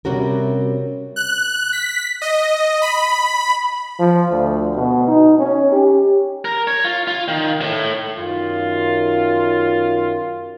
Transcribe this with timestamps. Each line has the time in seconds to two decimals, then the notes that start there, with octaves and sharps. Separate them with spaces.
0.05 C3 G3 C#4 F#4 A#4
1.16 F#6
1.73 B6
2.22 D#5
2.82 B5
4.00 F3
4.32 D2
4.76 B2
5.08 D#4
5.39 C#4
5.72 G4
6.45 A#4
6.67 C#5
6.84 F4
7.08 F4
7.28 D#3
7.62 A2
8.17 F#2 D#3 F4